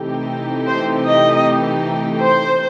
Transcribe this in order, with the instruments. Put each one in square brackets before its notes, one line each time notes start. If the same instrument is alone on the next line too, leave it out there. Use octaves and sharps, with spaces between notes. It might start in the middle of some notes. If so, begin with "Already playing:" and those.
Already playing: [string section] C3 E3 A3 D#4 G4
[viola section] C5
D#5
C5